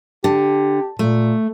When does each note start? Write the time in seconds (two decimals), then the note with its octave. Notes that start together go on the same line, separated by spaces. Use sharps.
0.24 D3 G4
0.99 A#2 A3